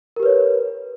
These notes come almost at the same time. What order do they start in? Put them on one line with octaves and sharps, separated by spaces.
A#4 G4 B4 C#5